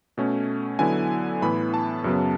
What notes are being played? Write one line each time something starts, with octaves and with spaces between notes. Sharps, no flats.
B2 A3 C#4
D3 F#3 B3 E4 G#5
A2 E3 B3 B5
A5
F#2 C#3 F#3 B3